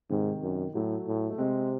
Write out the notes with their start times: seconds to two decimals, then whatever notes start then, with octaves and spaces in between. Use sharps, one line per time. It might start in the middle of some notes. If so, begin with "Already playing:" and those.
0.10 G#2 C3 D#3
0.43 F#2
0.74 A2 F#3 A3
1.07 A2
1.30 A3
1.38 C3 G#3 C4